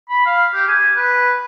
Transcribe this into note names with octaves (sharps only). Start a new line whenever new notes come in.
B5
F5
G4
G#5
B4